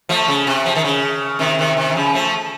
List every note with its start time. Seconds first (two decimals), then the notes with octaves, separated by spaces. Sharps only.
0.09 F3 A3
0.28 C#3
0.47 C3
0.66 F3
0.75 D#3
0.84 C#3
1.39 C3 D#3
1.59 C3 D#3
1.76 C3 D#3
1.90 D#3
1.95 C#3 F3
2.14 F3 A3